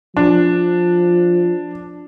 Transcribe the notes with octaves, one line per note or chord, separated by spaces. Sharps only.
F3 D4